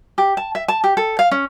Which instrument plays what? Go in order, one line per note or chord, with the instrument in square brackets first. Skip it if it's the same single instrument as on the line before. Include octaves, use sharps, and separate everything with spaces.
[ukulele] G4
A5
E5
A5
G4
A4
F5
C#4